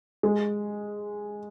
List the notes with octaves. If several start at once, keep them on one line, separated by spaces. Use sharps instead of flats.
G#3